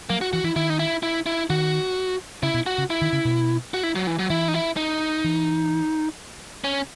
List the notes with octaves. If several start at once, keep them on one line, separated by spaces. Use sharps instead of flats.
F#3 A#3
F#4
E3 F#4
E3 E4
D#3 E4
D#4
E4
E4
E4
D#3 F#4
C#3 E4
B2
F#4
C#3
E4
D#3
C#3
B2
F#4
E4
F#3
E3
F#3
E3 E4
D#4
E4
D#4
E3
C#4